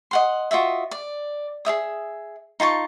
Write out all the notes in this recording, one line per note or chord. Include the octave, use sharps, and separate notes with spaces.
D#5 F#5 C6
F4 F#4 D#5 E5
D5
G#4 C#5 E5 D#6
D#4 F4 A5 C#6